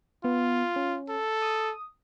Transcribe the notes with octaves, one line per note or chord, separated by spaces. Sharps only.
B3 F4
C#4
A4
D#6